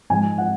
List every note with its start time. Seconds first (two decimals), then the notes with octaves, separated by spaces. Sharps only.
0.10 G#2 F3 G#3 G#5
0.38 F#5